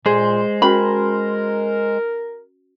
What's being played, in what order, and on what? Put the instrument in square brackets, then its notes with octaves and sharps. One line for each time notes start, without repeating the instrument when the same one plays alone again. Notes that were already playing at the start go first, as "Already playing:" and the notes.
[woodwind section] A#2 [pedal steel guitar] G#3 C5 [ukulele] G#4
[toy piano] C#4 F#4 [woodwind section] A#4 [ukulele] B5